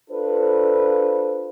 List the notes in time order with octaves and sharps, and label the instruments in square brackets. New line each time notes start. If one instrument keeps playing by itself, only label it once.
[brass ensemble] D4 F4 A4 B4 C5